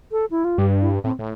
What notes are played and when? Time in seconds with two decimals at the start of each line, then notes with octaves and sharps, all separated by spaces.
0.12 A4
0.31 E4
0.45 F4
0.58 G2 G4
0.82 E4
1.04 A2 C4
1.19 A2